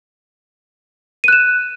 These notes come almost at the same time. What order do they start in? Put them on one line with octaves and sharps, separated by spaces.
D#7 F#6 E7